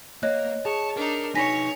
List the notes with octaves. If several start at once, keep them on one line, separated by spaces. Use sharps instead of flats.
A#3 C#5 D#5 F#6
G#4 C#5 A5
D4 D#4 A#4
D#4 B4 C#5 G#5 A#6 B6